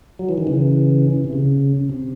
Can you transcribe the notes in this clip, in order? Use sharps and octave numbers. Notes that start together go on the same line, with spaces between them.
F#3
E3
D#3
C#3 E3
C3
C#3
C3